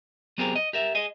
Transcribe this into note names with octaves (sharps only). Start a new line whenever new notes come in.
F#3 B3 C4 G4 G#4 A#4
D#5
G4 A#4 E5
G#4 D#5